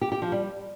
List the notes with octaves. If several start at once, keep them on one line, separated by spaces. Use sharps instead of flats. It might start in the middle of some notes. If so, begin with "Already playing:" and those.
G4
G4
F3
G3